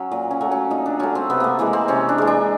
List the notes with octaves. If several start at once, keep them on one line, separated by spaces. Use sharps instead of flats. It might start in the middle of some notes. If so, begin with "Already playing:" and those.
Already playing: F#3 C#4
A#2
C#4
F#3 A3
C#4
A#2 D#4
D4
F#3 A3 C#4
C4
C3 B3
A3 A#3
E3 G#3 A#3
C4
C3 C#4
D4
E3 G#3
D4